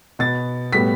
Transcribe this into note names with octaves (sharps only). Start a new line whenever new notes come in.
B2 B3 A6
A2 G3 B3 B6